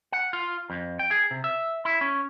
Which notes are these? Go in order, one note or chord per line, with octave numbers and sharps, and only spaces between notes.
F#5
F4
F2
G5
G#4
C3
E5
E4
C#4